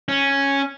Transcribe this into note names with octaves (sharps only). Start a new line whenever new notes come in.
C#4